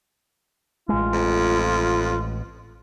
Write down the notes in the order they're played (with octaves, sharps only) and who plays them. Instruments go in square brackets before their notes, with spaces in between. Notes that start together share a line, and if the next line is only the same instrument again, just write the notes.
[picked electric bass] A1 G#3 [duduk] F4
[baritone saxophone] F2